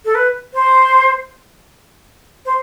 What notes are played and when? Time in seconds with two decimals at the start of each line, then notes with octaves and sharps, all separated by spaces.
0.05 A4
0.15 B4
0.54 C5
2.45 C5